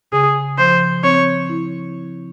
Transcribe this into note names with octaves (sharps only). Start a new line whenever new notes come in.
C#3 G#4
F3 C5
C4 C#5
E4